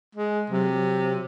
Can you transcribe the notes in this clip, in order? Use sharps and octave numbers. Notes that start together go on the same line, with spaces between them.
G#3
C3 F#3